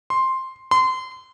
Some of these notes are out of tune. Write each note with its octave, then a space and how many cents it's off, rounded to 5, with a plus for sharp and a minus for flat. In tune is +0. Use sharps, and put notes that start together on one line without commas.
C6 +5
C6 -25